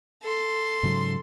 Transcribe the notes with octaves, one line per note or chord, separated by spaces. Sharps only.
A4 C6
G#2 C#3 F#3